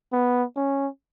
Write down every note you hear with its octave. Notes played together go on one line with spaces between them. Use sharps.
B3
C#4